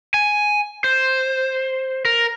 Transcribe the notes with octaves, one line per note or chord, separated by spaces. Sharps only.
G#5
C5
A#4